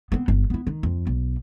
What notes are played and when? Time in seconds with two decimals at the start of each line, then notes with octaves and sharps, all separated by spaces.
0.12 B3 C4
0.28 G1
0.50 B3 E4
0.67 D#3
0.83 F2
1.07 B1